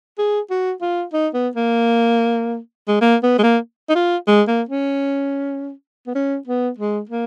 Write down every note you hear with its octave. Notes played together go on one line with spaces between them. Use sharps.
G#4
F#4
F4
D#4
B3
A#3
G#3
A#3
B3
G#3
A#3
D#4
F4
G#3
A#3
C#4
B3
C#4
B3
G#3
A#3